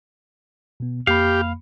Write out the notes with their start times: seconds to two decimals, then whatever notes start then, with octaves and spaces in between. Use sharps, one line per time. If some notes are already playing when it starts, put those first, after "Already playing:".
0.80 B2 B3
1.07 F2 A#3 G4 F5 B5